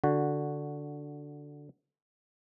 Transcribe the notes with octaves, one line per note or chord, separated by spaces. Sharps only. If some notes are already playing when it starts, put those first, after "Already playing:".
D3 F#4